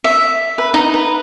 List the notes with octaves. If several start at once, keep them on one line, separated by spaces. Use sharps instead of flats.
E5
B4
D#4
B4